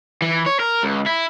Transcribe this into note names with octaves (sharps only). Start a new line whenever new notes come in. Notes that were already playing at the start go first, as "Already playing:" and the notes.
E3
C#5
A#4
C#2
E4